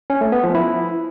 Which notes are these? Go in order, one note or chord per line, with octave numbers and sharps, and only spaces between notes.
C#4
A3
B3
F3
E4